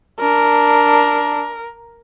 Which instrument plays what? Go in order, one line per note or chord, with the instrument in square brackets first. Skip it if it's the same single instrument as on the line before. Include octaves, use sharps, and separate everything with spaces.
[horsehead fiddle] D4 [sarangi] A#4